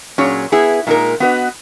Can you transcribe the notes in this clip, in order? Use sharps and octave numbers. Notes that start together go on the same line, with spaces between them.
A#2 F#3 C#4 G#4 C#5
B3 E4 G#4
A#2 G#3 D#4 A#4
B3 F#4 B4 D#5